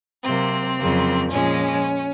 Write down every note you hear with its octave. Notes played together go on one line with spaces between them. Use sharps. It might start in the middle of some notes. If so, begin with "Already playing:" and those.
C3 F#3 A#3 C4
F2 C#3 F#3 A#3
A#2 F3 G#3 C#4